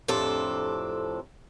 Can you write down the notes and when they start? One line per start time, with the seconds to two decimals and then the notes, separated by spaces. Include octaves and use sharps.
0.08 F2 A2 C3 D4 A4